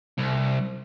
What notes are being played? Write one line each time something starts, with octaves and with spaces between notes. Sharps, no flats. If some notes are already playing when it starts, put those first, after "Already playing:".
C2